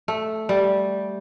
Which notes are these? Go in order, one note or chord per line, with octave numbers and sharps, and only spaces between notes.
A3
G3